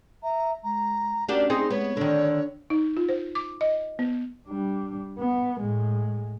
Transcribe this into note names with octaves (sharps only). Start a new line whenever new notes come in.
E5 A#5
G#3 A#5
C#4 D4 F#4 G4 A#4
C4 D#4 G#4 C6
G#3 B3 C#5
D3 D#3 D4
D#4
F4
C5
D6
D#5
B3
G3 D4
B3
A2 G#3